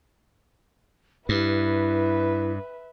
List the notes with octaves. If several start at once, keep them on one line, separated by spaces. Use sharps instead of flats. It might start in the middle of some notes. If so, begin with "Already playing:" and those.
G2 E4 B4 E5